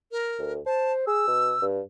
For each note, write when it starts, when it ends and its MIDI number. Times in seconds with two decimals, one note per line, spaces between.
0.12 0.53 70
0.39 0.60 38
0.66 1.02 72
0.66 0.93 81
1.07 1.27 68
1.07 1.65 88
1.28 1.54 47
1.62 1.81 43